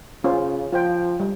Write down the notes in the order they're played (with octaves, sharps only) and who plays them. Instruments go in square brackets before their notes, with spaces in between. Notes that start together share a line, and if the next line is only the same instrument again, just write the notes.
[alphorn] C#3 [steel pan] C#4 F4 C5
[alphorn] F3 [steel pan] F4 C5 G5
[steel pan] G3